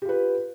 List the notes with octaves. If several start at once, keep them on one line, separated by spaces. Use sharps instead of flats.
F4 G4 B4